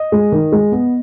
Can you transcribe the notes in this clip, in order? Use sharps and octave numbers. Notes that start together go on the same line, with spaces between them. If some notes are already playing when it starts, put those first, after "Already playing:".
Already playing: D#5
G#3
D#3
G#3
B3